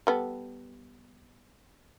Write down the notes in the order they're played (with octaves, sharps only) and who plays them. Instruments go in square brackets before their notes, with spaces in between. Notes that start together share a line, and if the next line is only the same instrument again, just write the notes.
[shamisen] G3 B3 A4